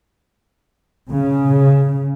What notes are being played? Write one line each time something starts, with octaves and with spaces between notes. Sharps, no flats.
C#3